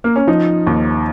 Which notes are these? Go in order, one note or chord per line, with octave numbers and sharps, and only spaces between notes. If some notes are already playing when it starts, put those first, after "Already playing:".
A#3
C#4
F3 D#4
D#2